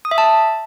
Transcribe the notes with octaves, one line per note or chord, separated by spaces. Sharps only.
D#6
E5
A5